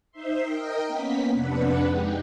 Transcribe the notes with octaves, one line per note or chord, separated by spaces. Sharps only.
D#4 C5 E5 C6
A#4 D#5 G5
A#3 B3 C#4 B6
F2 C3 D4 B4 F#5
G#3 D#4 G4